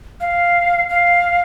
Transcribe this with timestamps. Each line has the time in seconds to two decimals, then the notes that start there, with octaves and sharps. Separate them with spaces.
0.20 F5
0.89 F5